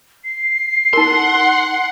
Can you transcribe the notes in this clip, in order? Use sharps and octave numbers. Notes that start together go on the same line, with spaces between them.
C7
D#4 A#4 F#5 C6